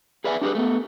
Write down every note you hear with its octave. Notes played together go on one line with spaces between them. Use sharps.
G#4 B4 D5 E5 G#5
D4 G4 G#4 B4
A3 B3